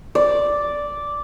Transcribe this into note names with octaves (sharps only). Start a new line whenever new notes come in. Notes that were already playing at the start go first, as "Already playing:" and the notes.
D5